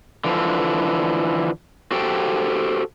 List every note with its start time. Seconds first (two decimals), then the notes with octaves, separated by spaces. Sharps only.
0.24 D3 E3 F3
1.91 F#4 G4 A4 C5 G5